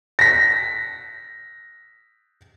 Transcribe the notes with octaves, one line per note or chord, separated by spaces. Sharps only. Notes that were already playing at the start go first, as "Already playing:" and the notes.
A#6 B6